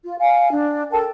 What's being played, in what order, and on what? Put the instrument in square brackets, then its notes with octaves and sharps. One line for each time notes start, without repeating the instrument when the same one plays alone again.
[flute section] F4
F5 G#5
D4
A4 A#4 G5 A5